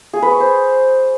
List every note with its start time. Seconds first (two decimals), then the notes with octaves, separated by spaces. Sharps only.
0.13 G#4
0.22 B4
0.31 C#6
0.40 C5